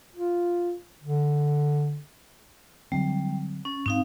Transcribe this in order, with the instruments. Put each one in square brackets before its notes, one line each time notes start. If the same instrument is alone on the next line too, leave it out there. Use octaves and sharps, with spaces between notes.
[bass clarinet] F4
D3
[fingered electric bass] D3 F#3 C4 [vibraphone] G3
[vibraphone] C#4
[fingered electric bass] G#2 [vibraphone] C4 D#4 F5